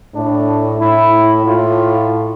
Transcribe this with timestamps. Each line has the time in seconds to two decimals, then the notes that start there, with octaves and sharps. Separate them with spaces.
0.14 A2 D4
0.81 A2 E4
1.46 A2 F4